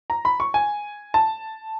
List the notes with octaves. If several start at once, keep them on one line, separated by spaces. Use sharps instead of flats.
A#5
B5
C#6
G#5
A5